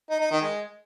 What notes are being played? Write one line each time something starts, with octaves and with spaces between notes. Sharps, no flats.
D#4
D#4
D#3
G#3